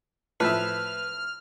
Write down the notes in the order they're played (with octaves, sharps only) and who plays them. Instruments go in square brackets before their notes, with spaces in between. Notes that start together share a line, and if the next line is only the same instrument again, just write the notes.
[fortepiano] A2 F3 E5 [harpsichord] B4 [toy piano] A5 [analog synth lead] F6